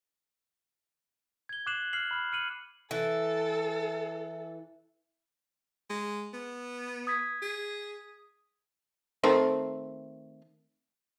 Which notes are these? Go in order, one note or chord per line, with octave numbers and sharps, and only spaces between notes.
G#6 G7
D6 F#6 C7 E7 F#7
F6 C7 F#7
B5 F6
F6 C#7 D#7 F#7
E3 A4
G#3
B3
D#6 G#6 B6
G#4
D#3 A3 C4